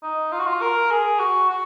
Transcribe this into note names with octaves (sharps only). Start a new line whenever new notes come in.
D#4
F4
F#4
F4
A#4
G#4
F#4
F#4